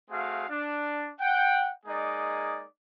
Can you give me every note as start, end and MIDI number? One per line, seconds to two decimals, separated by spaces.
0.10 0.45 57
0.10 0.45 60
0.10 0.45 66
0.10 0.45 68
0.10 0.45 77
0.49 1.10 62
1.20 1.70 78
1.20 1.70 79
1.86 2.65 56
1.86 2.65 58
1.86 2.65 63
1.86 2.65 68
1.86 2.65 74
1.86 2.65 75